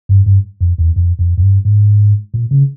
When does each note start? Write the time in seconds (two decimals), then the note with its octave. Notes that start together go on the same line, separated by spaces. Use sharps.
0.09 G2
0.26 G2
0.61 F2
0.78 E2
0.96 F2
1.19 F2
1.38 F2
1.42 G2
1.65 G#2
2.34 A#2
2.51 C#3